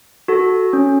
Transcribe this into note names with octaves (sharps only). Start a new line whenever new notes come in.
F#4 A4
C#4